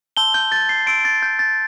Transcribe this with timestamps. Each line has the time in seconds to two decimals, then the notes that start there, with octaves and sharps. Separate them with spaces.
0.17 A5 C6 E6 G6 G7
0.34 G6
0.52 A6
0.69 C7
0.86 C6 E6 G6 D7
1.05 A6
1.22 G6
1.39 A6